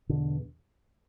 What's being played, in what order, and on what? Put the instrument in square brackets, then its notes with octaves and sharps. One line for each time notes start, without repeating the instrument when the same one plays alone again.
[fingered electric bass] E2 B2 D3